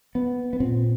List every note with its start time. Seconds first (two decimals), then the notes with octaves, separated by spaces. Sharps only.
0.15 B3
0.53 B3
0.60 A#2 C4